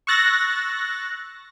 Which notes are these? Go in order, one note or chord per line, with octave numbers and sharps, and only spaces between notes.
C#6 E6 F#6 A6 A#6